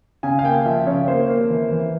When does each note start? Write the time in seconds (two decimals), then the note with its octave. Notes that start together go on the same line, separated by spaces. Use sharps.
0.23 C#3 G#5
0.39 F5
0.44 A#3 G5
0.65 F3 E5
0.87 C#3 C#5
1.08 A#3 C5
1.29 A#3
1.50 E3
1.71 E3